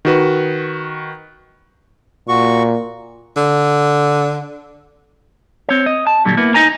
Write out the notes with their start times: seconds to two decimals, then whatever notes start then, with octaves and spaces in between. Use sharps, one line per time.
0.05 D#3 F#4 B4
2.28 A#2 F#4 C#6
3.37 D3
5.69 C4 C#5
5.86 D#5
6.07 A5
6.25 A#2 D3 F#3 G3
6.37 A#3 B3 E4
6.54 D#4 D#5 G#5 A#5